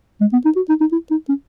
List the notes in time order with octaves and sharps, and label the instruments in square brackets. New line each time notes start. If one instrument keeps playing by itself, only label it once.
[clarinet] G#3
B3
D#4
F#4
D#4
D#4
E4
D#4
C#4